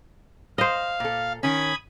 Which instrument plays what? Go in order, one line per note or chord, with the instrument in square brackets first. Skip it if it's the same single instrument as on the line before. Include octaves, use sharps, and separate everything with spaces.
[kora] C5 D#5 [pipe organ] F5
[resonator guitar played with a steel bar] A#2 A4
[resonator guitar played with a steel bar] D#3 C#4 [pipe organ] B5 D#6 G#6